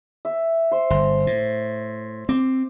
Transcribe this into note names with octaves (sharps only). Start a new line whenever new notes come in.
E5
C5
G1 C6
A2
C4 D6